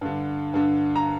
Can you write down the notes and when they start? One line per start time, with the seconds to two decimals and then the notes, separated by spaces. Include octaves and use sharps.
0.01 G2 D3
0.54 G2 D3
0.96 A#5